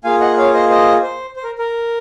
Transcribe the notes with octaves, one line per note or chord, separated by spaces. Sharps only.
A#3 F4 G#4 F5 G#5
D#5 F#5
C#5 F5
C5 D#5
C5 D#5
C5
C5
A#4
A#4